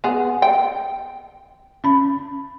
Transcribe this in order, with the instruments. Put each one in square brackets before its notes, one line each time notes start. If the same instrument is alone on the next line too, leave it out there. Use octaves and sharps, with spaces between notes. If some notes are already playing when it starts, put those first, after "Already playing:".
[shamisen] B3 G#4 [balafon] F#5
[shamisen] G5
[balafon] C#4 B5